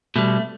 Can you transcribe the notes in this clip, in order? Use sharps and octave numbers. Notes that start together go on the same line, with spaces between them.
B2 G3 A3